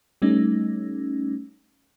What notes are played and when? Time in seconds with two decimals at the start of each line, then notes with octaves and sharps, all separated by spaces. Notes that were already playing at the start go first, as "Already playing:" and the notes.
0.22 G3 A3 C#4 D#4